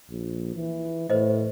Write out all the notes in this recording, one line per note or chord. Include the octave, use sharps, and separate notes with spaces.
A#1
E3
A2 B4 C5 D#5